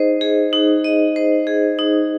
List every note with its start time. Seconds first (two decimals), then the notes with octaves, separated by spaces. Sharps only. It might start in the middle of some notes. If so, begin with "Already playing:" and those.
Already playing: D#4 G#4 C5 D#5
0.21 G#4
0.53 D#4
0.85 D#5
1.16 C5
1.47 G#4
1.79 D#4